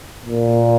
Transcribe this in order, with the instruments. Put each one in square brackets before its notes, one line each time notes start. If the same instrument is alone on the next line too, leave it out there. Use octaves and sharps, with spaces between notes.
[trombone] A#2